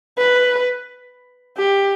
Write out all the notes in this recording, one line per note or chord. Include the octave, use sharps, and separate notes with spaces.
B4
G4